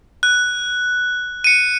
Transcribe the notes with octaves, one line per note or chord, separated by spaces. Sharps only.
F#6
C#7 D#7